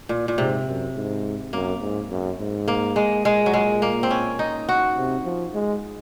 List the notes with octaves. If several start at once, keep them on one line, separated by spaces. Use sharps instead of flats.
A#2
A#2
G#2 C3
F#2
G#2
F#2 A#3
G#2
F#2
G#2
A#3
G#3
A#2 G#3
F#3
G#3
A#3
C4
C#4
D#4
F#4
C3
F3
G#3